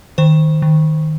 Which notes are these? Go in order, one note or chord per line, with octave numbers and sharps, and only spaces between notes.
D#3 C5
D#3